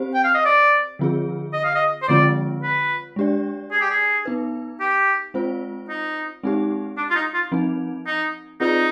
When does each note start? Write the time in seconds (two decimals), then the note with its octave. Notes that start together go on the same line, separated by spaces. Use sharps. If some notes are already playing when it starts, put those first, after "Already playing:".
Already playing: C4 G4 C5
0.14 G5
0.24 F5
0.35 D#5
0.45 D5
0.99 D3 F3 C4 F4 G#4
1.53 D#5
1.64 F5
1.75 D#5
2.03 C5
2.08 D3 F3 G#3 C4 F4 D5
2.62 B4
3.16 G#3 D4 G4 D5
3.71 G#4
3.81 G4
3.91 G#4
4.25 B3 D#4 B4
4.80 G4
5.34 G#3 C4 F4 C5
5.89 D#4
6.43 G#3 C4 D#4 G4
6.97 D4
7.10 F4
7.16 D#4
7.34 F4
7.52 F3 C4 D#4
8.06 D#4
8.60 C4 D#4 F4 G#4 B4 D5